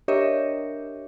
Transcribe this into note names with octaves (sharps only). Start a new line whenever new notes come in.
D4 G4 A#4 C#5 D#5 E5